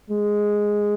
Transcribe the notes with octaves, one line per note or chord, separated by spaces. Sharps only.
G#3